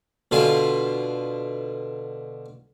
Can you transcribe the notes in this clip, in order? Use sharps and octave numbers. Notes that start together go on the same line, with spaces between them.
B2 D3 F4 G#5